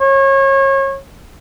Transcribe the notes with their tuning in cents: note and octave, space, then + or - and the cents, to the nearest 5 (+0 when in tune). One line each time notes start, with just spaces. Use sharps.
C#5 -30